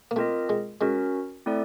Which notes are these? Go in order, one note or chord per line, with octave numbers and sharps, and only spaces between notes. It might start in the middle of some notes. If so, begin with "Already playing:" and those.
A#3
A3 C4 F4 A#4 D#5
G#3
G#3 C#4 F#4 A#4
A3 C4 E4 A4 D5